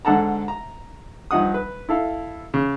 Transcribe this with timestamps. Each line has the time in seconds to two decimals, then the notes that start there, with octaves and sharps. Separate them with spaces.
0.05 G#2 D3 A4 F#5 A5 A#5
0.48 A#5
1.31 G2 F3 D#4 F#5 D#6
1.54 B4
1.89 E4 A4 F5
2.54 C#3